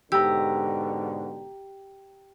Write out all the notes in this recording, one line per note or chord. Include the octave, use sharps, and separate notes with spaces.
G#2 B2 D3 G4 A#5 E6